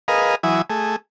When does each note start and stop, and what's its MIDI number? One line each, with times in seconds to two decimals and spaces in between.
0.08 0.35 68
0.08 0.35 70
0.08 0.35 71
0.08 0.35 75
0.08 0.35 77
0.43 0.62 52
0.43 0.62 54
0.43 0.62 64
0.43 0.62 80
0.43 0.62 87
0.70 0.96 57
0.70 0.96 68